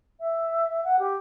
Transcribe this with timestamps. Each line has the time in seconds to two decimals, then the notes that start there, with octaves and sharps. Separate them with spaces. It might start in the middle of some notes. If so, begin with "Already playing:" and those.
0.20 E5
0.84 F#5
0.99 G4